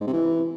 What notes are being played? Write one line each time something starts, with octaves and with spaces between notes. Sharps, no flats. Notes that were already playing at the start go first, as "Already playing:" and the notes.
G#2
C3
E3